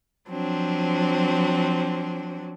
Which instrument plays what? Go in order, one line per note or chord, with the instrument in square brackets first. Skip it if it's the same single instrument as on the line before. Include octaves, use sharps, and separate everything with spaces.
[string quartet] F3 F#3 C4 D4